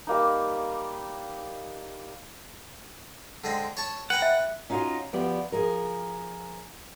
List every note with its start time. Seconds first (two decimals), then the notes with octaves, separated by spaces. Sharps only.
0.07 G3 A#3 D#4
3.44 D3 G#3 C4
3.77 C#5 A5 C#6
4.10 B4 F#5 G5 A#5
4.22 E5
4.70 C#4 D#4 F4 F#4 D#5 F5
5.13 D2 F3 B3 G4 D5
5.52 F3 G#4 A#4